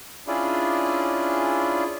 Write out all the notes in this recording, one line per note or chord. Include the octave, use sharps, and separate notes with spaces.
C#4 D4 E4 F4 G#4 D5